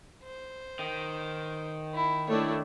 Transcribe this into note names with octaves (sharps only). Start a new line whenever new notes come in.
C5
D#3
E4
A3 D4 E4 C#5